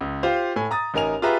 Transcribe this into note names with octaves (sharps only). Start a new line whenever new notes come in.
C#2
F4 G4 C5 F5
A2 G#5
A#5 D#6 A6
A1 D#4 A#4 G#5 F7
F4 G4 G#4 B4 E5 A#5